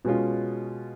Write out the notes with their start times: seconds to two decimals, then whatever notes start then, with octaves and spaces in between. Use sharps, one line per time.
0.05 B2 G#3 C#4 F4